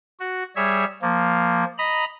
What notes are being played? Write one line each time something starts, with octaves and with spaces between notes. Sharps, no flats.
F#4
G3 G#4 C#5 E5
F3 A#3
D#5 A#5 B5